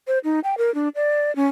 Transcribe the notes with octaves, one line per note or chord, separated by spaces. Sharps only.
C5
D#4
G5
A#4
D4
D5
C#4